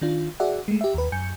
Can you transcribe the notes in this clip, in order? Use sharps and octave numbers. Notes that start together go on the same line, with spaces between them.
D#3 D4 F4
F#4 G#4 D5 E5 F#5
G#3 A3
G4 E5
D#2 B4
F#2 G#5 G6 C#7